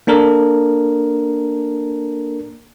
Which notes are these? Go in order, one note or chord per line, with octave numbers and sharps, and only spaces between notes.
A#3 D4 A4 A#4